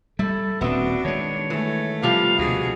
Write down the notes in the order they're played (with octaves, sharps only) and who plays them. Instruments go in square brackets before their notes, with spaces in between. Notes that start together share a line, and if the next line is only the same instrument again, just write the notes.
[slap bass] G3 [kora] E4 [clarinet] A4
[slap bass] D#1 C4 [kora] B3 E5 [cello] D4 [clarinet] F#4
[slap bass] D#3 G#3 [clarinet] C#5
[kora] E3 [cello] A3
[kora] C3 F3 G3 [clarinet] F5
[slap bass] D2 [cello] B2 G#4 [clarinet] F#4